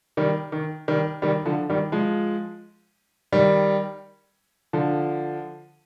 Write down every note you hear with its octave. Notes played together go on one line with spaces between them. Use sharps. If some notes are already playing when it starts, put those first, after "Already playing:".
D#3 G3
D#3
D#3 G3
D#3 G3
D3 F3
D#3 G3
F3 G#3
D#3 G3
D3 F3